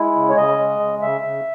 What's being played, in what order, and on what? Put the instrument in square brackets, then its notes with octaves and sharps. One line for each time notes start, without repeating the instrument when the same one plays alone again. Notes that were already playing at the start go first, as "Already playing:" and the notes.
Already playing: [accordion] G#3 E4
C#3
C#5
C#3 D#5
G#3
C#3
C#3 E5
C#3